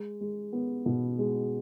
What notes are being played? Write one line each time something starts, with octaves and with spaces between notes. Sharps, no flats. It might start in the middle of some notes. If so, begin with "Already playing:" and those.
Already playing: G#3
G#3
B3
B2
G#3